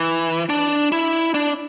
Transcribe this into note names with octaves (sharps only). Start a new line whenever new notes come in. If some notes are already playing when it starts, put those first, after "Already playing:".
Already playing: E3
D4
E4
D4